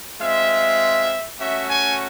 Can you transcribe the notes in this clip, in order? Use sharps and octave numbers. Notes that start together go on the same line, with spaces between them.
G#3 C4 F4 E5
A3 C#4 F#4 E5
G#5